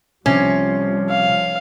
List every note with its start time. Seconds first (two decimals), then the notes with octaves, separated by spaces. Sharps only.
0.26 C2 C3 F3 G3 C#4
1.10 F5